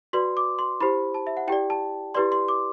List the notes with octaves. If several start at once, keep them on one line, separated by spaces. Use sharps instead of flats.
F#4 B4 D5 C6
D6
C6
E4 G4 C5 B5
A5
E5
F#5
E4 G4 D5 G5
A5
E4 G4 B4 D5 C6
C6
D6